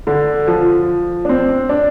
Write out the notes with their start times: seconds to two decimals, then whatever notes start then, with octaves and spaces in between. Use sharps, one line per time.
0.07 D3
0.47 F3
1.25 D4
1.29 C4
1.69 D4